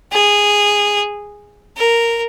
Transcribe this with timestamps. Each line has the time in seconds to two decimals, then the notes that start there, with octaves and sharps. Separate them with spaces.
0.12 G#4
1.77 A#4